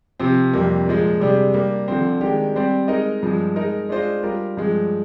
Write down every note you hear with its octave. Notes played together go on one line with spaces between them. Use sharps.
C3 F3 C4
F2 C3 G3 A#3
A#2 F3 G#3
C3 G3 D4 G#4
G3 A#3 D4
D3 F3 C4
D#3 G#3 D4 G4
G3 C4 G4 D5
G#3 D#4 A#4 D#5
G2 F3 G#3
G#3 D#4 A#4
G#3 D4 F4 C5 D#5
G3 D4 F4 A#4
G2 F3 G#3